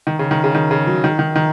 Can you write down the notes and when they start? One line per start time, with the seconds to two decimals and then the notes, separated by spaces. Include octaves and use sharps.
0.07 D#3
0.19 C#3
0.31 D#3
0.44 C#3
0.55 D#3
0.71 C#3
0.87 F#3
1.04 D#3
1.19 D#3
1.36 D#3